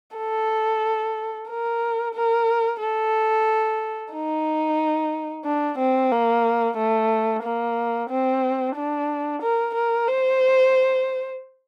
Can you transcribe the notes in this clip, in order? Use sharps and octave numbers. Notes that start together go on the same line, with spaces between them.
A4
A#4
A#4
A4
D#4
D4
C4
A#3
A3
A#3
C4
D4
A#4
A#4
C5